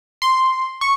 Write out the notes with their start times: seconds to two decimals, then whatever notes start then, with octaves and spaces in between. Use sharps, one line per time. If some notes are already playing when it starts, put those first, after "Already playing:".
0.22 C6
0.81 C#6